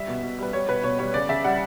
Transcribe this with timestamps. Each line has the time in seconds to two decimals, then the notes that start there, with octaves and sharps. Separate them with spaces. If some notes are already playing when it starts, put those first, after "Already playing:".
Already playing: G3 E5
0.08 B2
0.23 B2
0.38 G3 B4
0.53 G3 C#5
0.68 B2 B4
0.84 B2 C#5
0.99 G3 C#5
1.14 C#3 D5
1.29 C#3 E5
1.44 G3 F#5